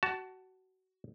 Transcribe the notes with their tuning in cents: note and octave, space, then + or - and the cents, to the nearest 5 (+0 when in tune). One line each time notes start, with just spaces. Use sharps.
F#4 +20 A5 +0